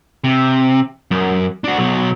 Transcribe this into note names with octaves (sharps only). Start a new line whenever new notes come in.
C3
F#2
D4 F#4
B1 F#3